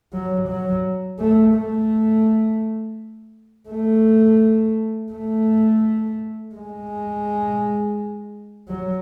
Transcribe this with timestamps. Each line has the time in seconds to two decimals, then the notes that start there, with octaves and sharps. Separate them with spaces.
0.13 F#3
0.48 F#3
1.19 A3
1.56 A3
3.70 A3
5.13 A3
6.56 G#3
8.69 F#3